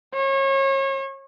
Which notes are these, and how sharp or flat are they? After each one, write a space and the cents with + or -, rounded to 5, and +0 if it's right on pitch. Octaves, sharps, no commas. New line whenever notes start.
C#5 -35